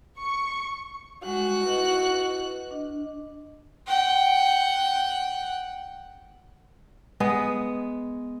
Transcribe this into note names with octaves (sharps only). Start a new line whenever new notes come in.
C#6
G3 G#3 F#4 F#6
E4 B4 D#5
D4 D#5
F#5 G5
G#3 B3 G#4